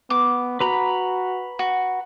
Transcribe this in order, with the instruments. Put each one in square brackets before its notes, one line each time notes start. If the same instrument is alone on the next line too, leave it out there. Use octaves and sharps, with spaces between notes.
[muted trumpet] B3 [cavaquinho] D6
[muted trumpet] F#4 [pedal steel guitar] B4 A#5 B5
[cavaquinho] F#4